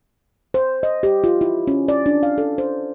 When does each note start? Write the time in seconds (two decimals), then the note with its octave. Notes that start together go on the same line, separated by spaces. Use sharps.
0.54 C5
0.83 D#5
1.03 G4
1.24 F4
1.41 E4
1.67 C#4
1.88 D5
2.06 D4
2.23 F5
2.38 A4
2.58 C5